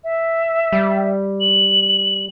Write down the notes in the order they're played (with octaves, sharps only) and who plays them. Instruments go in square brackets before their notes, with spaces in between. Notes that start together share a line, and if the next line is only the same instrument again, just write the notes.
[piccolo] E5
[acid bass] G3
[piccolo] F#7